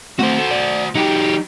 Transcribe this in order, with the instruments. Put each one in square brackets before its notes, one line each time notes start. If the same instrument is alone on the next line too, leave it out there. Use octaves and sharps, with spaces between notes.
[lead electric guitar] A3 C4 [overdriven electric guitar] F#4 C5
[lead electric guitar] A4
D5
[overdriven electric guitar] F#3 G4 [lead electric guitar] D#4